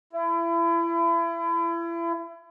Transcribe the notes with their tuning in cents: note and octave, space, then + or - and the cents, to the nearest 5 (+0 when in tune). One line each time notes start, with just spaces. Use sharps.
E4 +35